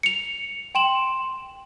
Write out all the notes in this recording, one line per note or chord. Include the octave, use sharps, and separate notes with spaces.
C#7 F7
G5 C6 E7 F#7